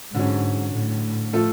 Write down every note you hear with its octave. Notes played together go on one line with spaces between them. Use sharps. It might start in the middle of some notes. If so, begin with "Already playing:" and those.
G#2 D3 F#3 C#4
A2
F3 A3 F4 A4